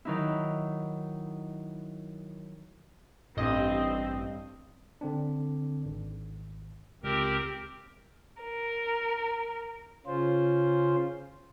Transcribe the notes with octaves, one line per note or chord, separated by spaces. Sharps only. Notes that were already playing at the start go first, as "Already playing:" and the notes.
D#3 F#3 D#4 E4
A1 G2 C4 D#5
D3 C4 D4
G#1
C#2 C4 G4 A#4
A#4
C#3 C#4 F4 C5